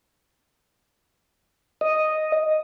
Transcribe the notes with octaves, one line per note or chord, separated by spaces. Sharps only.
D#5